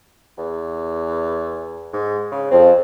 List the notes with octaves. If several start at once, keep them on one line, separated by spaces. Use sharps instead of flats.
E2
G#2
C#3
F2 C4